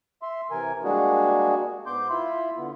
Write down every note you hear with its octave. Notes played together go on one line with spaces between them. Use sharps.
E5 C6
C3 E3 A#4 G#5
G3 G#3 A#3 D4 F#4 G#4
G#2 B3 C6 D6 G6
E4 F4 E5 B5 C6
D3 B3